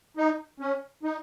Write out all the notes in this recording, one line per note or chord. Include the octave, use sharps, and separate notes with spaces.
D#4
C#4
D#4